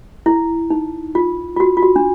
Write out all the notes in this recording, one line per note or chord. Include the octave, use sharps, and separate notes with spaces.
E4
D#4
F4
F4
F#4
F4
F#4
D4